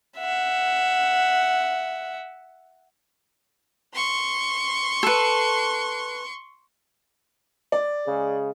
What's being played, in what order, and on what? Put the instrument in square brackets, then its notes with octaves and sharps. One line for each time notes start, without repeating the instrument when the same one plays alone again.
[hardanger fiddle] E5 F#5
[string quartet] C6 C#6
[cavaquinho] A4 B4
[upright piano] D5
[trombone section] C#3 G#3 G#4